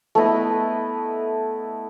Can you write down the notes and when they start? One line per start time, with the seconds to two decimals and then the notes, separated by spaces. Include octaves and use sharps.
0.15 A3 B3 E4 D#5